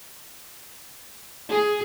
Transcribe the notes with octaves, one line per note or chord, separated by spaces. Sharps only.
G#4